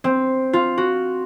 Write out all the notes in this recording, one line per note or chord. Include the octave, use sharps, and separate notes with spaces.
C4
F4
F#4